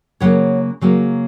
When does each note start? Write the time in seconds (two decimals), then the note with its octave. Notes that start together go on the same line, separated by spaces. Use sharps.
0.20 C#3 F#3 A#3 C#5 F#5
0.81 C#3 F#3 A#3